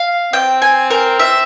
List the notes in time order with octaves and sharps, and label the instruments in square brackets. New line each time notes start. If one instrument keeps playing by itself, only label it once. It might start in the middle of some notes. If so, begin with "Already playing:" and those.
Already playing: [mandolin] F5
[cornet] C4 [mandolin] G5
[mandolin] G#5
A#4
E5